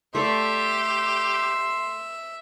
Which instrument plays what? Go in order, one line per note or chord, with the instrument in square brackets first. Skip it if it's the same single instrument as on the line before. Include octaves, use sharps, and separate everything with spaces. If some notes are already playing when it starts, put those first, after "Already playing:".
[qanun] A3 D5 [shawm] G4 [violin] E5 [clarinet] C6